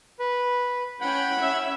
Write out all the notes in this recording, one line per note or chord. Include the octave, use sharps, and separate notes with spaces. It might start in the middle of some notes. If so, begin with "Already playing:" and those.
B4
C#4 E4 F#5 G5 B5
C#4 E5